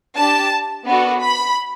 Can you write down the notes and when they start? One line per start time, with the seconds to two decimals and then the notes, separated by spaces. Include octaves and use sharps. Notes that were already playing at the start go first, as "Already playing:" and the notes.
0.16 D4 G4 A5
0.85 B3 D4 F#4 A4
1.20 B5